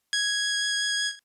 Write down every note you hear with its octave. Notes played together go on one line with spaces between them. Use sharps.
G#6